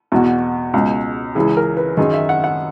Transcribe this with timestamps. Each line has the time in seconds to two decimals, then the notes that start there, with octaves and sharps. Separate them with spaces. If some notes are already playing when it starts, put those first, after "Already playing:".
0.12 E2 B2 F#4
0.74 C#2 B2
1.35 C#2 C#3 E3 G#4
1.57 A#4
1.77 B4
1.97 F#2 D#3 G#4
2.13 E5
2.29 F#5
2.44 F#5